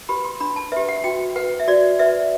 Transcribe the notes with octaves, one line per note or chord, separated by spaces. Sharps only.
G4 B4 B5
C6
D4 B5
A5
G4 B4 E5
F#5
F#4 G5
B4 F#5
E5
F#4 D5
B4 E5